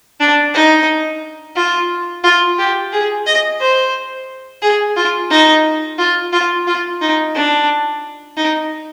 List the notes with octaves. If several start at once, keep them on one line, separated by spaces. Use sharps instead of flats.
D4
D#4
F4
F4
G4
G#4
D#5
C5
G#4
F4
D#4
F4
F4
F4
D#4
D4
D#4